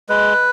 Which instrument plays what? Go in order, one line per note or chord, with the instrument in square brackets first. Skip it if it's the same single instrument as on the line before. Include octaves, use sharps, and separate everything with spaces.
[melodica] G#3 B4